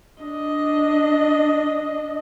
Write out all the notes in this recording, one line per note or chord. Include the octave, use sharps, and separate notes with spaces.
D4 D#5